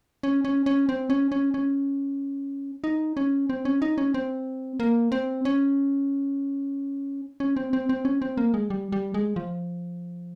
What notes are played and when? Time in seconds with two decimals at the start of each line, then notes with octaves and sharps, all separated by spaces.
0.23 C#4
0.45 C#4
0.66 C#4
0.89 C4
1.10 C#4
1.32 C#4
1.54 C#4
2.84 D#4
3.17 C#4
3.50 C4
3.65 C#4
3.82 D#4
3.98 C#4
4.14 C4
4.80 A#3
5.12 C4
5.45 C#4
7.40 C#4
7.57 C4
7.73 C4
7.89 C4
8.05 C#4
8.22 C4
8.37 A#3
8.54 G#3
8.70 G3
8.92 G3
9.14 G#3
9.36 F3